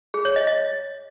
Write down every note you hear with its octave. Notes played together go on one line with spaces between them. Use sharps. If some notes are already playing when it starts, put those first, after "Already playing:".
G#4
C#5
D#5
D#5